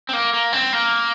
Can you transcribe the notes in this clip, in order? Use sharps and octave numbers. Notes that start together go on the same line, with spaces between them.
C4
A#3
A#3
C4
A#3